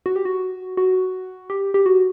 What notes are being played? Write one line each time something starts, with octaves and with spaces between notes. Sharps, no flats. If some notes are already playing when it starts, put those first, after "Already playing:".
F#4
G4
F#4
F#4
G4
G4
F#4